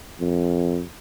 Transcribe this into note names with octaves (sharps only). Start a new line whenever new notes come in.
F2